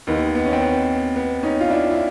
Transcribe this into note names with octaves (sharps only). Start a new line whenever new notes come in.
D#2 D#3 B3
B3
C#4
C4
B3
B3
C#4 D#4
F4
D4 E4
E4